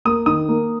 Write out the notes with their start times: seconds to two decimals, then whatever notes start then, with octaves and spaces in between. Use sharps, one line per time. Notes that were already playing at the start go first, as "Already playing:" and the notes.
0.05 A#3 D#6
0.26 D#3 D#6
0.49 A#3